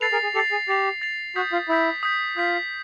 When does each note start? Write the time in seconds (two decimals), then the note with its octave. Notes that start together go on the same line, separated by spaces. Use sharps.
0.01 A4 B4 A6 C7 F7
0.12 G#4 A#4
0.23 G#4
0.35 G4 A4 A6 C7 F7
0.51 G#4
0.68 G4 A6 C7 F7
1.02 A6 C7 F7
1.36 F#4 D#6 G6 B6
1.53 F4
1.69 E4 D#6 G6 B6
2.03 D#6 G6 B6
2.37 F4 D#6 G6 B6